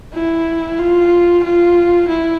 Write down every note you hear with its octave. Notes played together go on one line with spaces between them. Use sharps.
E4
F4
F4
E4